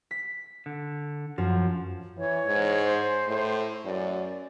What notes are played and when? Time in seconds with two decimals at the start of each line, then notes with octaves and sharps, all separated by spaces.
0.11 B6
0.66 D3
1.38 F#2 F3
2.18 E3 C#5
2.46 G#2
2.84 C5
3.27 A2
3.85 F#2 D5